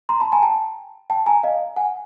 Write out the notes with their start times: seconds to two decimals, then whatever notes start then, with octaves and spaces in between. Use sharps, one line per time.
0.09 A#5 C6
0.20 A5 B5
0.32 G#5 A#5
0.42 G5 A5
1.10 G5 A5
1.26 G#5 A#5
1.43 D#5 F5
1.76 F#5 G#5